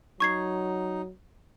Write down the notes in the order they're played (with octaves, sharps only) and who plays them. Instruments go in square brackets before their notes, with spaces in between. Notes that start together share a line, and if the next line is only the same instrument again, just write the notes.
[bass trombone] F#3 [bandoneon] D#4 [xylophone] C#6 G#6 C7